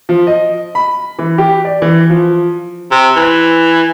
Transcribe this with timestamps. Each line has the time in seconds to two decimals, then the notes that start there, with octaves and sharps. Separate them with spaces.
0.09 F3
0.27 D#5
0.75 B5
1.19 E3
1.38 G4
1.65 D5
1.82 E3
2.10 F3
2.91 C3
3.16 E3